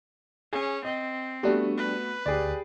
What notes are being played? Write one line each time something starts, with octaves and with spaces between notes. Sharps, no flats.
C#4 G#4
C4 D#5
G3 A3 B3 D4 F#4 G4
B4
D2 G4 G#4 D5